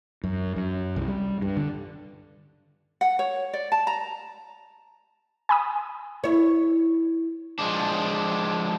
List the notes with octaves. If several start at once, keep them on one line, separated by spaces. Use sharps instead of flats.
F#2
F#2
C2
G3
G2
D3
F#5
C#5
D5
A5
A#5
G#5 B5 D#6
E4 C#5
F3 G#3 D4